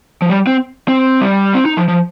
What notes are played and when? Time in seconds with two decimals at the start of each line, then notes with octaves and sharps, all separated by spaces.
0.22 F3
0.29 G3
0.47 C4
0.88 C4
1.21 G3
1.54 C4
1.65 D#4
1.77 F3
1.88 F3